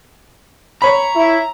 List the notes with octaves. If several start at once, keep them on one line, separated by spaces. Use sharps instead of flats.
C#5 A#5 B5
E4